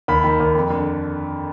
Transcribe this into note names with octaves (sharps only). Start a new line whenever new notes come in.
D#2 B5
D#3
D#2
F2
D3